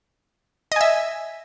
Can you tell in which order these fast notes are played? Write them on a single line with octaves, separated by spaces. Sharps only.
D#5 G#5 E5